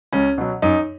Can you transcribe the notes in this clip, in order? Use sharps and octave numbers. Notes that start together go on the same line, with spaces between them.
C#2 C#4
B2 F#3
F#2 D#4